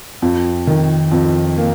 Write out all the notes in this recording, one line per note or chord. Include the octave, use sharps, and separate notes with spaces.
F2
D#3
F2
A#3